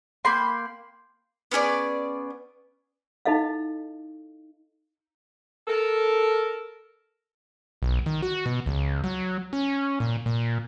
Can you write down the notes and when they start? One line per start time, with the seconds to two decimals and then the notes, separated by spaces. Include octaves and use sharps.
0.25 A#3 G5 B5 C6
1.51 B3 C#4 G#4 D5
3.25 D#4 E4 A4 D#5 F5
5.68 A4 A#4
7.82 B1
8.06 D#3
8.23 F#4
8.46 B2
8.66 C#2
9.04 F#3
9.53 C#4
10.00 A#2
10.26 A#2